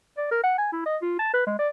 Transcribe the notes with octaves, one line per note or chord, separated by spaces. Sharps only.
D5
A#4
F#5
G#5
E4
D#5
F4
A5
B4
G#3
D5